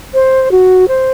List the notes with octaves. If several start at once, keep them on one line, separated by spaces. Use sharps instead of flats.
C5
F#4
C5